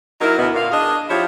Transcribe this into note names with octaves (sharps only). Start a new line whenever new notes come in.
F#3 D#4 E4 A#4
D2 B2 B3 E4
A#2 F5
D4 G#4 D#5
F3 E4 F4 G4 C#5